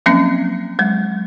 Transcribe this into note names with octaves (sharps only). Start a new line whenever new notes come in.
F3 F#3 A#3 C4 C#4
F#3 G#3